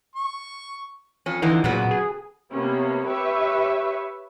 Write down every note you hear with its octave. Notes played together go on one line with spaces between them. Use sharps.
C#6
F2 C#4
F2 D3 E3 D#4
A#2 C#3 F#3 B3
G#4
C3 A#3 B3 C#4
G4 B4 C#5 E5 C#6